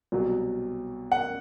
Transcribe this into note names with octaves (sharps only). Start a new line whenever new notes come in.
C2 B2 F#3
F#5